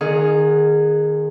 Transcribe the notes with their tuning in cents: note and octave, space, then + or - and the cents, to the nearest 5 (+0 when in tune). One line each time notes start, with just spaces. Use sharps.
D#3 -25 G#4 +0 F#5 +0